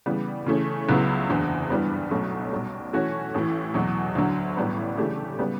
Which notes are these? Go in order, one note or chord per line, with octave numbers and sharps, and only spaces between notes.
C#3 E3 G3 B3
C#3 E3 A3 C#4
C#2 C#3 F#3 B3 E4
F#1 E2 D3
G2 E3 G3 B3
B1 B2 F#3 A3 C#4
B1 B2 G3
E3 A3 C#4 F#4 C#5
A1 A2 E3
E2 B2 F#3
D2 D3 F#3
A1 A2 G3 B3
C#3 E3 A3 D4 G4
C#3 G3 B3